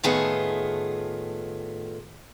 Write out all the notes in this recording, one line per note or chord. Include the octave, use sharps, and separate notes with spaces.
A2 D#3 A3 B3 F4 G#4